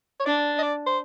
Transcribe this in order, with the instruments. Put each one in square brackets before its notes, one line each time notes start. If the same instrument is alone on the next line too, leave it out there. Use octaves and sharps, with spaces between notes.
[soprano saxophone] C#5
[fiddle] D4 [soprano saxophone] D5
[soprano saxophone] D#5
D5
C5